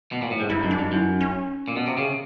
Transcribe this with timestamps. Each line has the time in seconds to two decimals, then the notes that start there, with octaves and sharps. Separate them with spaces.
0.12 B2
0.22 A#2
0.31 A2
0.40 G#2
0.50 G2 E4
0.60 F#2 D#4
0.71 D4
0.79 G2 D#4
0.92 F#2 E4
1.06 D#4
1.21 C#4
1.68 A#2
1.76 B2
1.87 C3
1.98 C#3